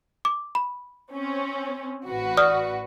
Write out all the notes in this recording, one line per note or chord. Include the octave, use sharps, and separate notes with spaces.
D6
B5
C4 C#4
A1 F#4 B4
D5 D#6 F6